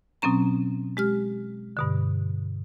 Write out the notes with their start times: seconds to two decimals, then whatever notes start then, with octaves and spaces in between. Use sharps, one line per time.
0.22 B2 F#3 C4 C#4 A#5
0.97 G#3 G4 F6
1.77 G2 B2 D3